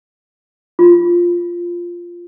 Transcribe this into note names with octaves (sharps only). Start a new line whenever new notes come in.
F4